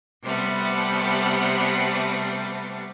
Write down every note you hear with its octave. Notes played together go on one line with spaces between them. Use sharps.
C3 G3 A3 B3